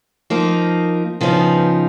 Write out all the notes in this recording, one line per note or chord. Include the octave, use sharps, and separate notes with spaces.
F3 A#3 D#4 A#4
C#3 F3 B3 D#4